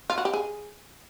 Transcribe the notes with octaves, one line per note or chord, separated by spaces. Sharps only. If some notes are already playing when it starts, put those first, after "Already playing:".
F4
F#4
G4
G#4